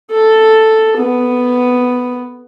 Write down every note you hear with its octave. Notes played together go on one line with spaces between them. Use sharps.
A4
B3